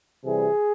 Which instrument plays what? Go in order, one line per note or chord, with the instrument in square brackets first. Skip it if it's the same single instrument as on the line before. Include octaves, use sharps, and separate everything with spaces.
[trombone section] C3 E3 G3 G#4